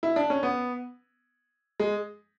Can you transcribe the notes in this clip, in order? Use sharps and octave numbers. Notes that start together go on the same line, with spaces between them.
E4
D4
C#4
B3
G#3